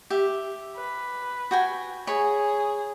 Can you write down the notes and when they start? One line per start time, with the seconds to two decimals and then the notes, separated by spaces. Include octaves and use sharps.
0.10 G4 E5
0.76 B4
1.51 F#4 G5 G#5
2.07 G#4 C#5 B5